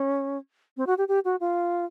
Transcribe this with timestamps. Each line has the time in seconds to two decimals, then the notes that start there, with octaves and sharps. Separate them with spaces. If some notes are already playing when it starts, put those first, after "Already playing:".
Already playing: C#4
0.77 C4
0.87 F#4
0.98 G4
1.08 G4
1.25 F#4
1.41 F4